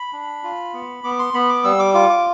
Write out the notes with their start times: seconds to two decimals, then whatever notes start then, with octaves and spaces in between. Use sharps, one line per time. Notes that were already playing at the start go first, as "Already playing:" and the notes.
Already playing: B5
0.13 D4
0.44 F4
0.74 B3
1.04 B3 D6
1.19 C6
1.34 B3 B5
1.49 D6
1.64 G3 E6
1.79 D6
1.94 F4 D6
2.10 D6